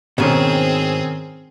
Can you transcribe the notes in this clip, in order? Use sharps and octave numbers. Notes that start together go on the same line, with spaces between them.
G#2 B2 D#3 C4 C#4 G#4